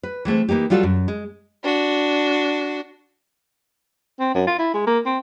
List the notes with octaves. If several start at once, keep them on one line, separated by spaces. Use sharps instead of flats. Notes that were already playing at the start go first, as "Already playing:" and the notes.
B4
E3 G#3 A3 C4
E3 A#3 D#4 G4
F#3 G3 F4 F#4 G#4 A4
F#2
G#3
D4 F#4
C4
F#2
F4
E4
G#3
A#3
C4